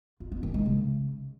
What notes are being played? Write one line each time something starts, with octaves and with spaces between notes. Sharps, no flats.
F4
B3
D#3
G#3
C#3